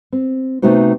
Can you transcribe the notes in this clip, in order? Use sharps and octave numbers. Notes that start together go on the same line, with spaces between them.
C4
C3 A3 B3 D#4 F#4 C5